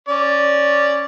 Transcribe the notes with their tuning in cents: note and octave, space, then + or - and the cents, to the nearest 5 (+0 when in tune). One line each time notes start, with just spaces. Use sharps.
C#4 -5 D5 +0